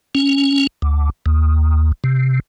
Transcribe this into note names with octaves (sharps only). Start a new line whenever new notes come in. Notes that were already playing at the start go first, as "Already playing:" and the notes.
C#4
D2
D#2
C3